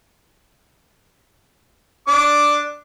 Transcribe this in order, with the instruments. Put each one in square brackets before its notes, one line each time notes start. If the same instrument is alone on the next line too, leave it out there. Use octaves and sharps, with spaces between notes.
[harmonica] D4 D6